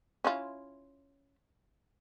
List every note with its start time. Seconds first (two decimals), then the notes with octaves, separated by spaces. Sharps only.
0.24 C#4 E4 F4